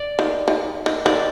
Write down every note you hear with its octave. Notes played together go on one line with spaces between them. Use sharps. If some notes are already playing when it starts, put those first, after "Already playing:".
Already playing: D5
D#3
D#3
D#3
D#3 D5